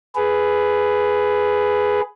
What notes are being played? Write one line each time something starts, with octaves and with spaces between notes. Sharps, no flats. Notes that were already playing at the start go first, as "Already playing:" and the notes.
G#4 B4